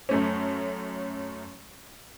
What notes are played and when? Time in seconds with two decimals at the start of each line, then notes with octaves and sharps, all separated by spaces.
0.09 F#2 A3 C#4